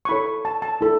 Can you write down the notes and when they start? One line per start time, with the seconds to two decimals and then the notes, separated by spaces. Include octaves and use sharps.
0.05 C#6
0.09 E4 A4 C#5 B5
0.45 A5
0.62 A5
0.81 E4 A4